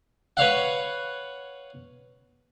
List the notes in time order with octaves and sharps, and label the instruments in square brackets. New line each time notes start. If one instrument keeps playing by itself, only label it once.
[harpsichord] B4 C#5 F5 F#5